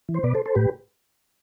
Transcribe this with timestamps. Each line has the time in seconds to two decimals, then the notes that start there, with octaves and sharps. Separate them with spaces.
0.09 E3
0.14 C5
0.23 B2 B4 D5
0.35 A4 C5
0.46 A4 C5
0.55 A2 G4 B4